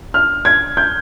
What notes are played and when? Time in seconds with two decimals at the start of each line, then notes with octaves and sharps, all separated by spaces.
0.14 F6
0.45 G#6
0.77 G6